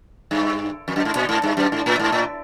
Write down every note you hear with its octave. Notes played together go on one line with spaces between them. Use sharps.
G2
F2
F#2
G#2
A#2
G#2
G2
F#2
G#2
A2
G#2
A2